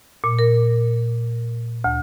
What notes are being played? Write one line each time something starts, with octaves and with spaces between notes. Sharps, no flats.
A#2
A#4
D2